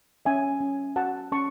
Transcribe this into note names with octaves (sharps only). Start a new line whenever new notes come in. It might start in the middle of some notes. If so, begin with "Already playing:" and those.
C#4 E5 G#5
C#4
F#4 F#5 A5
C#4 A5 C#6